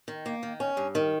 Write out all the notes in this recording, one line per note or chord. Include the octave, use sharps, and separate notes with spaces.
D#3
A#3
D#3
C#4
G2
D#3